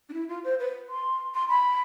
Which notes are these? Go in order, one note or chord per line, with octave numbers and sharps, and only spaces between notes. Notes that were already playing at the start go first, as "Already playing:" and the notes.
D4
E4
F4
C5
B4
C6
C6
B5